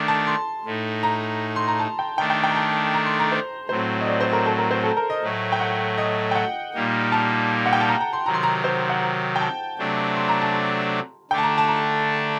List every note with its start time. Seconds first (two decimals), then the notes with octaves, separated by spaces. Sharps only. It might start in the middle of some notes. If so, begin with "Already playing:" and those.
Already playing: D#3 A3 D4
0.08 A5
0.27 C6
0.65 A2 A3 D#4
1.03 A#5
1.56 C6
1.68 A#5
1.80 A5
1.99 G5
2.17 D#3 A3 D4 G5
2.30 G5
2.43 G5
2.50 A#5
2.55 A5
2.94 A#5
3.06 C6
3.19 A#5
3.32 C5
3.69 A2 F#3 C4 C5
4.01 D#5
4.07 D5
4.21 C5
4.33 A#4
4.46 A4
4.58 A#4
4.71 C5
4.83 A4
4.97 A#4
5.10 D#5
5.22 A2 F#3 A3
5.52 G5
5.60 F#5
5.98 D#5
6.31 G5
6.35 F#5
6.74 A#2 G3 A#3 D#4
7.12 A5
7.66 F#5
7.73 G5
7.81 A5
7.88 A#5
8.01 A#5
8.13 C6
8.26 C3 D#3 F#3 A#5
8.34 C6
8.43 A#5
8.64 C5
8.90 F#5
9.36 G5
9.41 A5
9.78 C3 F#3 A3 D4
10.16 C6
10.28 A#5
10.41 A5
11.31 D3 A3 D4 G5
11.38 A5
11.43 A#5
11.58 A5
11.68 A#5